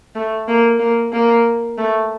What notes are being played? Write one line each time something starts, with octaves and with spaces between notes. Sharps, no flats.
A3
A#3
A#3
A#3
A3